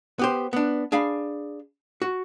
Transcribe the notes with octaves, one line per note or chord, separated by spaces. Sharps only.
B3 G4 C5
B3 D4
D4 G#4 F5 B5
F#4